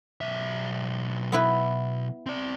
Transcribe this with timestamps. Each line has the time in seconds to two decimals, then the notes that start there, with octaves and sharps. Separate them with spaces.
0.21 B1 E5
1.32 B3 E4 B4
2.26 C4 D5